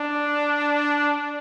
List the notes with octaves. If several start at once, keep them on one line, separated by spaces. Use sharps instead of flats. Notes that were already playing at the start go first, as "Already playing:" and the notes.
Already playing: D4